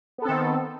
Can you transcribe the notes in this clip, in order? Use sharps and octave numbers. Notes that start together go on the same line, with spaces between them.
D#3 B3 C4 A4